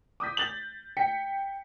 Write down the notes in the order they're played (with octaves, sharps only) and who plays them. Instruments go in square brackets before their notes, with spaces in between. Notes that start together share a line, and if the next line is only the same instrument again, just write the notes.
[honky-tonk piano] D6 D#6 G6 B6
G6 A6 F#7
G5 B6 C#7